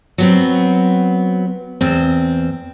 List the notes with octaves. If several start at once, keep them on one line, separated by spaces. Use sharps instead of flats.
F#3 B3 C4
E2 C4